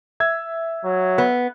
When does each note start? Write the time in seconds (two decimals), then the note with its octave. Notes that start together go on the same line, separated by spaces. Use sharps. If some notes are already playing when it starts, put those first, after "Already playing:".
0.20 E5 E6 G#6
0.85 F#3
1.18 B3